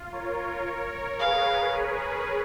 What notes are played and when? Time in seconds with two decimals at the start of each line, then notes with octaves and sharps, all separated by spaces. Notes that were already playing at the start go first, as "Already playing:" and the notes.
Already playing: F4
0.12 A#4 C#5
1.19 G#4 B4 F5